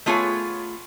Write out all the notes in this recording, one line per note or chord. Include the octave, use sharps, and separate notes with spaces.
A3 B3 F4 G#4 C#5 G#5